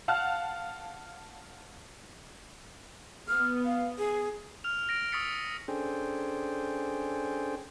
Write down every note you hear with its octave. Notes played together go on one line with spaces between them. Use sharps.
F5 F#5 A5 F6 F#6
B3 F6
F5
G#4
F6 F7
F6 A#6 D7
C#6 D#6 E6 A6 B6 C#7
C#4 D4 G#4 A4 C5 G5